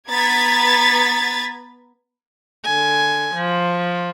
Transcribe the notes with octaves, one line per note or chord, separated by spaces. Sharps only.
B3 B4 A#5 G#6 A6 B6
D3 G#5
F3